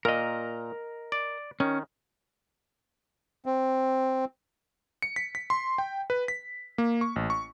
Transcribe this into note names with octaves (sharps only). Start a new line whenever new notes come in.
A#2 A#4 D#5
D5
D#3 C#4
C4
C#7
B6
B6
C6
G5
B4
B6
A#3
C#6
A1
C#6